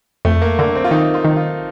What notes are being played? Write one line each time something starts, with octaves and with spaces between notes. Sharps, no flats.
F2 A3
A#3
D3 A#3
C4
F4
D#3 D#4
F4
D#3
F4